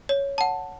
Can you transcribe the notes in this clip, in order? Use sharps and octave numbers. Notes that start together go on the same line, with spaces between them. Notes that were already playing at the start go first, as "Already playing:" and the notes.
C#5
F#5 A5